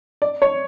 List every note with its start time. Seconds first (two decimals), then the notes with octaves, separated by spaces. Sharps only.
0.22 D5
0.42 C#5